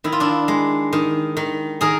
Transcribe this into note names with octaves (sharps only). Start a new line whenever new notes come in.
D#3 E4
F4
D4 E4
G#3
D#3
D#3
D#3 G#4 A#4